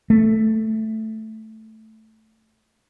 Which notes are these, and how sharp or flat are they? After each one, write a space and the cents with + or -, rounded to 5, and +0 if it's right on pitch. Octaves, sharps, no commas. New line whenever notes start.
A3 +0